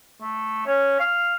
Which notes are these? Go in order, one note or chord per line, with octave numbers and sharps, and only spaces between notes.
A3
C#4
F5